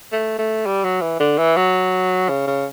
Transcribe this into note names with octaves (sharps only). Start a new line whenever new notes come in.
A3
A3
G3
F#3
E3
D3
E3
F#3
C#3
C#3